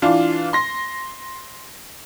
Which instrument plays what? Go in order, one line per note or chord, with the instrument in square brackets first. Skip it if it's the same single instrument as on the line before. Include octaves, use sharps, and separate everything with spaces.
[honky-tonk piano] E3 D4 F4
C6 A#6